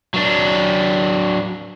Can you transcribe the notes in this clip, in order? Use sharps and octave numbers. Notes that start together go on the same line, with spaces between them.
F#3 D4